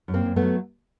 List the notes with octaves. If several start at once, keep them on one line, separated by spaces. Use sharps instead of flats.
F#2
A#3 C4
F#2
A3 B3
F#3